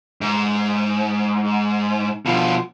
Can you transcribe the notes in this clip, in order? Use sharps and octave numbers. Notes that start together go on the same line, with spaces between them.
G#2
B2 F3